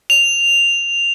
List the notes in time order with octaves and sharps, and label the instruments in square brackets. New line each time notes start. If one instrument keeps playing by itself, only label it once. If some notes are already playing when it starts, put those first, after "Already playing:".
[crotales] F7